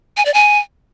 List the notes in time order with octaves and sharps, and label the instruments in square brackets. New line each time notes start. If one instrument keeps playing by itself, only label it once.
[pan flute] G#5
D5
G#5